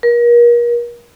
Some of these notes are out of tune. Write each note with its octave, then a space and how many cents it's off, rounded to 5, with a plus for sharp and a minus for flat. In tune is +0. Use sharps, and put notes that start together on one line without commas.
A#4 +35